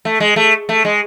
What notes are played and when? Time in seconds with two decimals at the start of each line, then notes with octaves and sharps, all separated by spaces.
0.05 A3
0.20 G#3
0.36 A3
0.69 A3
0.85 G#3